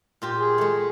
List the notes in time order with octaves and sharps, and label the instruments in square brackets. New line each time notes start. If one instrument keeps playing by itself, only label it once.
[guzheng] A#2 F4 G4
[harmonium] G#4
[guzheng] G#3 A3